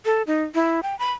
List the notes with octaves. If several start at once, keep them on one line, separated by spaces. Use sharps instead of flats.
A4
D#4
E4
G5
B5